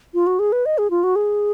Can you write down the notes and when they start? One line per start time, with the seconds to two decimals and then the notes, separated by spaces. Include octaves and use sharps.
0.14 F4
0.27 F#4
0.39 G#4
0.52 B4
0.66 D#5
0.78 G#4
0.90 F4
1.04 F#4
1.16 G#4